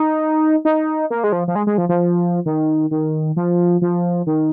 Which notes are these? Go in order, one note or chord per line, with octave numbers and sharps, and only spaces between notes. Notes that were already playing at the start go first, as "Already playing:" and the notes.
Already playing: D#4
D#4
A#3
G#3
F3
F3
G#3
G#3
F3
F3
D#3
D#3
F3
F3
D#3